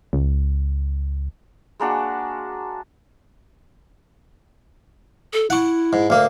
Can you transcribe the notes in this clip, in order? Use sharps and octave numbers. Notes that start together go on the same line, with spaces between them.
C#2
G#3 A#3 D4 F#4
A4
E4 F#5 C#6
G#2
D2 A#3